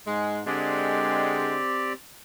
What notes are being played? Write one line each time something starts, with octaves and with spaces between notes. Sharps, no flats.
G#2 G#3
D3 G#3 C4 G4 D5